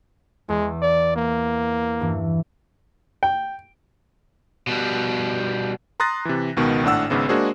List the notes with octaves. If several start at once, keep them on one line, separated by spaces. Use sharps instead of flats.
E2 G#3
D5
A#3
G2 E3
G5
B2 G3
A#5 C6 D#6 F#6 A6 A#6
C3 E3
C#2 B2 D#3 B3
G#1 A2 D4 F#5 E6
G#1 G#2 C#3 B3
G#3 A#3 D4 F#4 G#4 C5